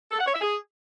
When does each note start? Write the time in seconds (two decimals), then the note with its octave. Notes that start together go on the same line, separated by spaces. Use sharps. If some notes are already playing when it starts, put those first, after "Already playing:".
0.11 A4
0.19 F#5
0.26 C#5
0.34 E5
0.41 G#4